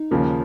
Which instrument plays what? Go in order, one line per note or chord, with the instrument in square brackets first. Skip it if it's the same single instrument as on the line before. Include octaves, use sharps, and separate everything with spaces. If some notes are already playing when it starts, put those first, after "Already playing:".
Already playing: [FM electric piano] D#4
[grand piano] D#2 C#3 F3 A#3